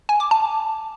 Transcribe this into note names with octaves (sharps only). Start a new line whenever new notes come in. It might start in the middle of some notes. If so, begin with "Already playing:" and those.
G#5
D6
A5